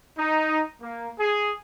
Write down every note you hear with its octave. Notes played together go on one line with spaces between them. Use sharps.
D#4
A#3
G#4